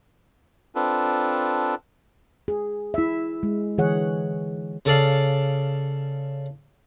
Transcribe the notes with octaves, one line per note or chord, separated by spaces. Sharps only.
C4 D4 F4 A4 B4
G#4
E4 E5
G#3
D3 E3 G#4 C#5 F#5
C#3 A4 D5 F5